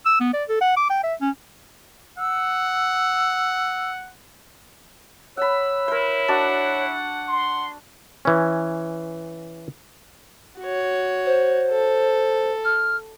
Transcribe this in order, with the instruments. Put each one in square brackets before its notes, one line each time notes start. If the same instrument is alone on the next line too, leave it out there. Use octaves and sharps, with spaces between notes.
[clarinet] E6
B3
D5
A4
F#5
D6
G5
E5
C#4
[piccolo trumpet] F#5 [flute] E6
[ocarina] C#5 [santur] F#5 B5 [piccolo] E6
[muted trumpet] E4 [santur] A#4 C5
[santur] D4 F#4 A5 [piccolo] F#5
[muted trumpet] C6
[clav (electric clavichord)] E3 C#4
[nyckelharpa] F#4 C#5
[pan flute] C5
[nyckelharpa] A4
[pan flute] F6